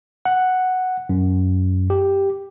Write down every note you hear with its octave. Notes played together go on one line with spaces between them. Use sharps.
F#5
F#2
G4